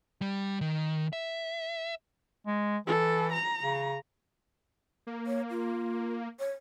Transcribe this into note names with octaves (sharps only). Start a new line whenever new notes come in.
G3
D#3
E5
G#3
E3 A4
A#5
C#3
A#3
C#5
F4
C#5